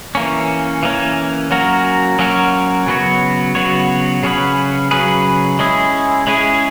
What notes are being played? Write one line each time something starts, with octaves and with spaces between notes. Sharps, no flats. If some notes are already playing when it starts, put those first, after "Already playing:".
E3 A#3 C#4
E3 A#3 C#4
F#3 A#3 C#4 F#4 A#4
F#3 A#3 C#4 F#4 A#4
C#3 F#3 B3 F#4 C#5
C#3 F#3 B3 F#4 C#5
C#3 F#3 C#4 G#4 B4
C#3 F#3 C#4 G#4 B4
G#3 C#4 E4 G#4
G#3 C#4 E4 G#4